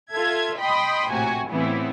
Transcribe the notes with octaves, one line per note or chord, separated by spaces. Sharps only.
F4 A4 E5 G#6
D#5 G5 B5 C6 D#6
A#1 A2 C3 F#4 G#5
A2 C#3 E3 B3 C4 E4